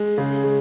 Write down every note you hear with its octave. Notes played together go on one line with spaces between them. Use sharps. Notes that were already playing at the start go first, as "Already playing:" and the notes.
Already playing: G#3
C#3
G#3